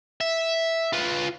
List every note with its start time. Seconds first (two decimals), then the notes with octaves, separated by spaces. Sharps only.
0.21 E5
0.93 F4 B4